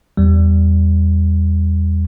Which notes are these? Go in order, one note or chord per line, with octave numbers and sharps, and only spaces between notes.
E2 G3